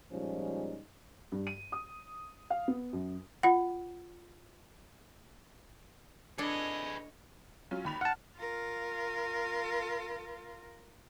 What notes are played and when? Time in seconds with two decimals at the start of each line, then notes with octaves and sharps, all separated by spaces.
0.12 A#2 F3 G3 G#3 C#4 D#4
1.32 G2
1.47 D#7
1.72 D#6
2.50 F5
2.68 B3
2.93 F#2
3.43 F4 F#5
6.38 D4 G#4 A4 B4 C#5 D#5
7.71 F#3 C#4 F4
7.85 D#2 B5 F7
8.01 F#5 A5 F6
8.36 F4 A#4